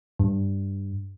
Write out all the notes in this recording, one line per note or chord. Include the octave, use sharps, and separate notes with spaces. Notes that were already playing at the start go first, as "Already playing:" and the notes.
G2